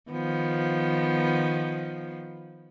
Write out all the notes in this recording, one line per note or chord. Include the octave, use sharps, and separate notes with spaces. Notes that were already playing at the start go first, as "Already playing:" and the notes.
D#3 F3 B3